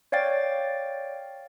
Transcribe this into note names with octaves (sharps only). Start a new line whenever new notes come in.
C#5 D5 F5 G5 A6